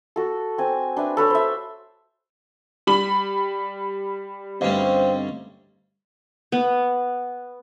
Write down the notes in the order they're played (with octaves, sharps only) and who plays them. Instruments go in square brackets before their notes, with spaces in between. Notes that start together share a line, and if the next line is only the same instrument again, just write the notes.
[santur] F#4 A4
C4 G#5
D4 B4 E5
A4 B4 C#5
C5 E5
[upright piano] G3 B5 F#7
[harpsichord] D2 G2 C#4 [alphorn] C4 [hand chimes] C5 D#5 F5
[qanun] B3